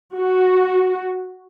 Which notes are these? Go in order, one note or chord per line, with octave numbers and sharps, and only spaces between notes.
F#4